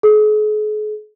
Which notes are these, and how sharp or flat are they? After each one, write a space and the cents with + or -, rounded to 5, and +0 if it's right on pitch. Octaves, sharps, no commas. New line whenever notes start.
G#4 +45